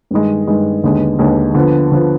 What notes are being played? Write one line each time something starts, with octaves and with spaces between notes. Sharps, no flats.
G2 D#3 G#3
G2 D#3 G#3
D#2 D3 G#3 B3
D#2 D3 G#3 B3
D3 F3 B3
D3 F3 B3